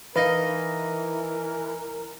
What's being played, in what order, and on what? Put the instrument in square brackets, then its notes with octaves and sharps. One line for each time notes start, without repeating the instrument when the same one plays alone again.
[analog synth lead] E3 [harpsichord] D#4 D#5 F5 [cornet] A#4 [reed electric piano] B4